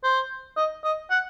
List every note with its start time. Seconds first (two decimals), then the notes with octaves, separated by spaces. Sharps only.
0.04 C5
0.57 D#5
0.84 D#5
1.10 F#5